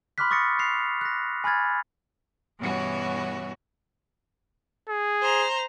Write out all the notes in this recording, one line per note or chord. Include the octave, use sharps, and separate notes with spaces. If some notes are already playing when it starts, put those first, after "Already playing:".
B5 C6 D6 F6 F#6 B6
C#6 D#6 A6 A#6 C#7
F#6 A6 C7 F7
F#6 A#6
G#5 B5 F6 G#6 A6
G2 B2 E3 B3 C#4 F#4
G#4
C5 A#5